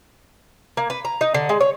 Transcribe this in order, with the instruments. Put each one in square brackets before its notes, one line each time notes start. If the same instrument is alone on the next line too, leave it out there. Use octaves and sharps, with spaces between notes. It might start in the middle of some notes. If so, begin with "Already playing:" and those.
[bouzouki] A#3
B4
A#5
D#4
D3
G#3
C#5